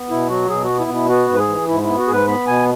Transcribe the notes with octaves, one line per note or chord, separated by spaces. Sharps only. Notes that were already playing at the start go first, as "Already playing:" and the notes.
Already playing: B3
B2 E4
F#3 F#4
B2 G#4
F#4
B3
E4
B2 E4
B3 F#4
G#2 B4
G#4
E3
G#2 E4
B3 E4
F#4
G#2 G#4 B4
B3 B5
B2 G#5